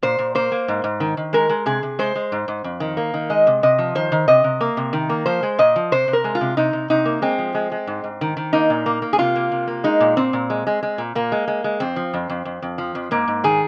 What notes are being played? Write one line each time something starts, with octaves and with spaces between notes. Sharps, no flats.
A#2 C5
A#2
A#3 C5
A#3
G#2
G#2
D#3
D#3
G#3 A#4
G#3
C3 G#4
C3
G#3 C5
G#3
G#2
G#2
F2
D#3
A#3
D#3
G#3 D#5
C3
C3 D#5
F3
D#3 C5
D#3
C3 D#5
C3
A#3
C3
D#3
A#3
F3 C5
G#3
A#2 D#5
F3
C3 C5
C3
A#4
G#3
F4
C3
C3 D#4
C3
C3 D#4
A#3
G#3 C4
F3
G#3
G#3
G#2
G#2
D#3
D#3
A#3 D#4
A#2
A#3
A#3
G#4
C3 F4
A#3
C3
A#3
G#3 D#4
A#2
A#2 C4
A#2
G#3
G#3
G#3
A#2
A#2 A#3
G#3
G#3
G#3
F2 C4
F3
F2
F2
F2
F2
F3
F2
G#2 A#3
G#2
D#3 G#4